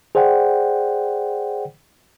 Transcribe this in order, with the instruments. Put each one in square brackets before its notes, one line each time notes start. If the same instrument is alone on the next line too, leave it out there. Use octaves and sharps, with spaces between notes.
[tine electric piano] G#4 C5 D5 F#5 G5